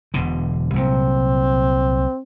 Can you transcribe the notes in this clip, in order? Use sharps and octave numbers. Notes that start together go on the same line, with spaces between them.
E1 B2 D3
C2 A#2 F#3 C4